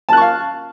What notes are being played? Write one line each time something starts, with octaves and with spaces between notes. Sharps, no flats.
F5 A5 C#6 F#6